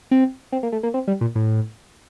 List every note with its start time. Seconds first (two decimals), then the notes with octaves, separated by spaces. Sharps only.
0.11 C4
0.52 C4
0.63 A#3
0.72 A3
0.83 A#3
0.94 C4
1.08 G3
1.21 A#2
1.35 A2